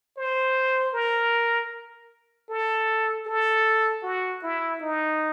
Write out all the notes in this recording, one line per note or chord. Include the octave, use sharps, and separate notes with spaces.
C5
A#4
A4
A4
F#4
E4
D#4